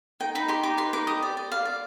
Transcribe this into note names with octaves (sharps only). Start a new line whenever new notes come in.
D#4 G5
D#4 B5
G4 C6
D#4 D6
B4 C6
D#4 D6
G4 D#6
D5
D5
D5 F5
D5